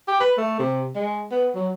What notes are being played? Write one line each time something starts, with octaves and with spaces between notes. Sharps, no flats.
G4
B4
A3
C3
G#3
B3
F#3